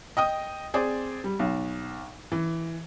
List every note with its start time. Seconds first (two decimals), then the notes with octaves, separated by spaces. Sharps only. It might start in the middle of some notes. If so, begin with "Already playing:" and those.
0.17 D#5 G5 D#6
0.74 C4 G#4 C5 D5
1.24 G3
1.39 B1
2.32 E3